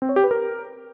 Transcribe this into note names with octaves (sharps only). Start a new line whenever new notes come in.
C4
C#5
G4
B4
A#4